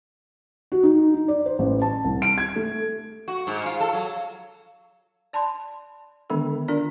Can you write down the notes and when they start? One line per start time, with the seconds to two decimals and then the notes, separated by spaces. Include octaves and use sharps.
0.72 F#4
0.83 D#4
1.14 D#4
1.28 D5
1.46 C5
1.59 A1
1.82 A5
2.05 C2
2.22 D7
2.38 G#6
2.56 A3
3.28 F#4
3.47 G#2
3.66 F4
3.81 A4
3.93 F#3
5.33 D5 A5 B5 C6
6.30 D3 D#3 G#3 B3 D4 A4
6.68 D4 F4 A#4 D5